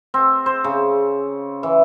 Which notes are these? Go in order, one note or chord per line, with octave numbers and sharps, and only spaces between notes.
C4
C5
C#3
E3